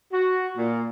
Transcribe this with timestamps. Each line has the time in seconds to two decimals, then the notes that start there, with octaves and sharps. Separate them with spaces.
0.12 F#4
0.57 A#2